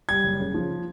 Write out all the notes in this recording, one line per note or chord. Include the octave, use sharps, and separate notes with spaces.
G3 G#6
F#1
C#3
F3